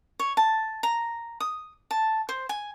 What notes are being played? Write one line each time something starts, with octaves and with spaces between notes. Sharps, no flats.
C#5
A5
A#5
D#6
A5
C5
G#5